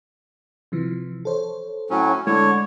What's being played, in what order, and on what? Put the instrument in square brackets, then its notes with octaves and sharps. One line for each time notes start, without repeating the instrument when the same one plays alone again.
[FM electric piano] C3 E3 F3
A4 C5 C#5
[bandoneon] A2 F#3 C#4
[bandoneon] D3 C#5 [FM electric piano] G#3 A3 E4